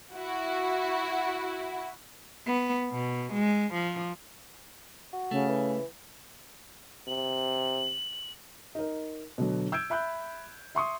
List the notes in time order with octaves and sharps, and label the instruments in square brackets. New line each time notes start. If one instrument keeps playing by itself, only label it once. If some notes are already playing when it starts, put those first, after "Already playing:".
[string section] E4 F#4
[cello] B3
B2
G#3
F3
[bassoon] F#4
[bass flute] C#3 [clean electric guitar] A3
[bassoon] E3
[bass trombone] C3 [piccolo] F#7
[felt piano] D#4 A#4
B2 D3 F#3
E6 G6 G#6 D7
E5 B5 F#6 G6
E5 C6 C#6 D#6